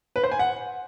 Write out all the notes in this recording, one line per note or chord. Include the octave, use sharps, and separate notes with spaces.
B4
C5
G#5
F#5